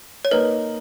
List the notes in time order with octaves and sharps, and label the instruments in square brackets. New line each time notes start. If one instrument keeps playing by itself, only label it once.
[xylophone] C#5
[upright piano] A#3 D#4 A#4 [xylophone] B4